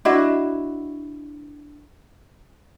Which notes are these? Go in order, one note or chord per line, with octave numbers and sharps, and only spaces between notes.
D4 E4 F#4 D#5